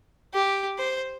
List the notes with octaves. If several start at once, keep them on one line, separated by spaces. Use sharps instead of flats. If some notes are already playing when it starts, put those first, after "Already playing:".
G4
C5